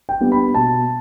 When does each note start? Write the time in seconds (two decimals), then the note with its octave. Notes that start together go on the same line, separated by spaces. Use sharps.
0.09 G5
0.21 G3 B3 D4
0.32 B5
0.54 B2 A5